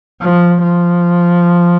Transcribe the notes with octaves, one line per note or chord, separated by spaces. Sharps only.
F3
F3